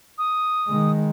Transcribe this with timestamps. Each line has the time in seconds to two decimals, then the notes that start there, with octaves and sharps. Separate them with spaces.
0.18 D#6
0.68 D#3 G#3